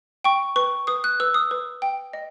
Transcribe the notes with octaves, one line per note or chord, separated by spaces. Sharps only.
G5 C#6
B4 C#6
B4 D#6
F#6
B4 E6
D#6
B4
G5
D#5